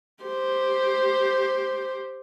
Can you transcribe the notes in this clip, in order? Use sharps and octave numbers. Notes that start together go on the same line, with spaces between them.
G4 C5